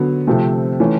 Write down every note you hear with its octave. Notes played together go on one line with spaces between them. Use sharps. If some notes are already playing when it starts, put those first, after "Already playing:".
Already playing: D3 F#3 B3
C3 F3 A3 C4
E3 A3 C#4